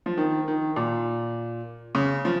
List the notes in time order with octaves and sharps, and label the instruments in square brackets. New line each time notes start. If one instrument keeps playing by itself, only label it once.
[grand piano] F3
D#3
D#3
A#2
C#3
F3